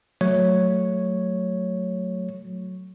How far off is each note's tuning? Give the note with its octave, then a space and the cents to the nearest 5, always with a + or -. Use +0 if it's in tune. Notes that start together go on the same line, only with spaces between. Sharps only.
F#3 +0 A3 +0 C#5 +0